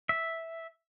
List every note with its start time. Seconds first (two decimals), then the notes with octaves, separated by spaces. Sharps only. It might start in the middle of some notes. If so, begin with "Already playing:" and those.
0.09 E5